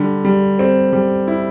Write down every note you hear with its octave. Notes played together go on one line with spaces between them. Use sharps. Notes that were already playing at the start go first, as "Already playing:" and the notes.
Already playing: D3 G3
G3
C4
G3
E4